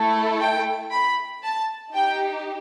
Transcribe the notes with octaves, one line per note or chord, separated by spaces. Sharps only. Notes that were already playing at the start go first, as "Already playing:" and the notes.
Already playing: A3 E4 A4
G5
B5
A5
D#4 G4 G5